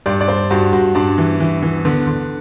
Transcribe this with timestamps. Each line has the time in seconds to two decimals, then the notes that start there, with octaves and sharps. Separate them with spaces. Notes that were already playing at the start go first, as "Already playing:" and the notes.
0.06 G2 D5
0.21 D5
0.28 G2 C5
0.50 G2 F#4
0.73 G2 F#4
0.95 G2 D4
1.18 E3
1.40 E3
1.62 E3
1.85 D3 B3
2.07 D3